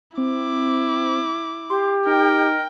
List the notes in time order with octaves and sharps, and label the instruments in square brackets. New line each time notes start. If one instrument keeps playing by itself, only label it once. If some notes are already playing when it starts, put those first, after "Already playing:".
[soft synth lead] C4 [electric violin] E4 D6
[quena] G4 [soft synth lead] C6
[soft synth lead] D#4 [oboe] A#4 [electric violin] G5